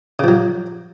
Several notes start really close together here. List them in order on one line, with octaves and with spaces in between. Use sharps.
C#3 F3 F#3